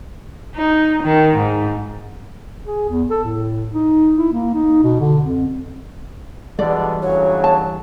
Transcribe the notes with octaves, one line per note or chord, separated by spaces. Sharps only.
D#4
D#3
G#2
G#4
E2
A4
A2
D#4
E4
A#3
D#4
B2
D3
F2
E2 B2 D3 E3 G3 G#3 D5
D2 C#3 F#3 C#5
A5